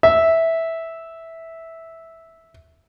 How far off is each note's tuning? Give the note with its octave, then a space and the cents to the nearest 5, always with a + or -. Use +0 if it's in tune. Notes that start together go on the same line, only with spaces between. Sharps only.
E5 -10